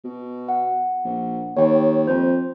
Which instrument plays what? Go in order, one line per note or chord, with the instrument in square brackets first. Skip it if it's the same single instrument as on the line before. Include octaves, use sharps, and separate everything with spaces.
[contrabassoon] B2
[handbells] F#5
[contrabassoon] A#1
[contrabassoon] D#2 [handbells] C#5 G5
[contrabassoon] F2 [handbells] C5